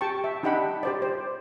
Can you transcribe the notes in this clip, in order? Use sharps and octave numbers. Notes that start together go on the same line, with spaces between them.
G4 G5 A5 C#6
E5
D4 D#4 G4 F#5 G5 B5
G4 C5 D5
C5